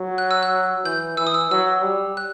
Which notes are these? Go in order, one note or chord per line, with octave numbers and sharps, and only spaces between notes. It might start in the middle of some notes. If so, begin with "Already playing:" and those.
Already playing: F#3
F#6
E6
F#6
E3 G6
E3 E6
D#6
E6
F#3 E6
G3
F#6